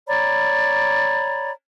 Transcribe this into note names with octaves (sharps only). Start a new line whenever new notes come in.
C#5 D5 A#5 B5